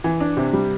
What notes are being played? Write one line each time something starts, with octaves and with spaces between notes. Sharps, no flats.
E3
D4
C3
G3